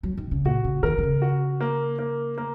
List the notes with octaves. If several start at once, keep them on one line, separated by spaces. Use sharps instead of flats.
F#3
D#3
C#3
A#2 F#4
C#3
D#3 A#4
D#3
C#3
F#4
A#3
A#3
A#3